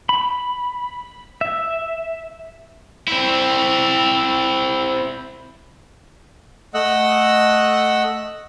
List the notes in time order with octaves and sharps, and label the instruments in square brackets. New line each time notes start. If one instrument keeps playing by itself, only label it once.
[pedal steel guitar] B5
E5
[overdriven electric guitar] C4 E4
[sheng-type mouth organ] A3 D#5 F#5 E6 F#6